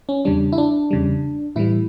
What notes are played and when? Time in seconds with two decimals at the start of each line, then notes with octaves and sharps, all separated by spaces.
0.09 C#4
0.25 E2 C#3 G3 D4
0.52 E4
0.58 D4
0.91 E2 C#3 G3
1.56 A2 E3 G3 E4